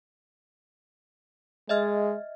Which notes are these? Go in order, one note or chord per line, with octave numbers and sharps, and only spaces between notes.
G#3 D#5 E5 F6